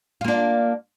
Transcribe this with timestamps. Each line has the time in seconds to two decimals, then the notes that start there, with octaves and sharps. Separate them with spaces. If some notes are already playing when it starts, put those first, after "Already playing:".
0.21 F4
0.24 A#3
0.28 D4